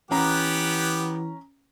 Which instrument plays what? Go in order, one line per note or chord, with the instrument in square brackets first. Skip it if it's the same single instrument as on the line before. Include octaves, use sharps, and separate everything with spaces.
[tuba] E3 [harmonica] B3 G4 F#5 [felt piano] C#4 A#5